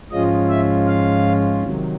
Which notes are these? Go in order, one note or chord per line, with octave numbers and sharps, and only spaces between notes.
G#2 F3 G#3 C#4 F4 D#5
E5
F5
C3 D#3 F#3